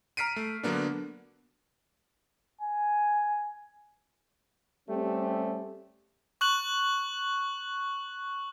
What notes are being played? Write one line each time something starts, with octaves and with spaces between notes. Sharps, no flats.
A#5 F6 B6 C7 D7 D#7
A3
D3 F#3 A#3 B3 D4
G#5
G3 A3 C4 C#4 G4
C#6 F#6 F#7